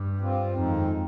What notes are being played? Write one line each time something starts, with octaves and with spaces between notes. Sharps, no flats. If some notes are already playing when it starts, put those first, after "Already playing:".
Already playing: G2
G3 C4 F4
F2 D#3 G#3 C4 D#4